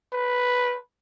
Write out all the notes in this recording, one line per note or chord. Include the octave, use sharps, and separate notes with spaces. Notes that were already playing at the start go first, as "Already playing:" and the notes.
B4